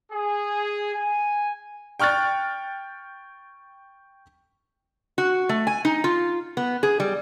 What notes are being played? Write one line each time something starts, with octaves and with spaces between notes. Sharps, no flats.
G#4
G#5
G5 C#6 F6 F#6 A6
F#4
A3
G#5
D#4
F4
B3
G#4
G3